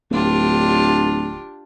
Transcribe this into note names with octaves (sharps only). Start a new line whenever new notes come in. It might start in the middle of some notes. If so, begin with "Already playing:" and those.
D1 D4 F4 G4